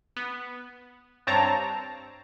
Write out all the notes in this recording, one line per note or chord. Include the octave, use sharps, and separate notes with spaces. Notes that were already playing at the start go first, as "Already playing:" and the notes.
B3
G2 C4 C#5 A5 A#5